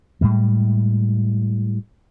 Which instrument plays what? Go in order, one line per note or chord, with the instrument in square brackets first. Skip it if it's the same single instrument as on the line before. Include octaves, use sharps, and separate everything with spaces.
[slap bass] A2 G3 G#3